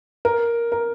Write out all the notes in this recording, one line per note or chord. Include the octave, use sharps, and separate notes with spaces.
A#4
A#4